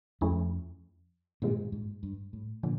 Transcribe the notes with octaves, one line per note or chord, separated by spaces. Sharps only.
F2 F3 A3 C#4 E4
G2 A#2 D#3 G#3 C4 F4
G#2
G2
A2
A#2 D3 F3